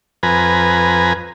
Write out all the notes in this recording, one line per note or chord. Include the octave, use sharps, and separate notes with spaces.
F2 B4 G#5 A#5